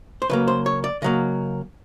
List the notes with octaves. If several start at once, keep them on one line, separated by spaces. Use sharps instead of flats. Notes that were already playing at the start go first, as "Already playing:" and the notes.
C5
C#3 F#3 A#3 B4
C5
C#5
D5
C#3 F#3 A#3 D#5